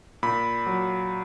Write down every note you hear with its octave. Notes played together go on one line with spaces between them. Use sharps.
A#2 B5
F#3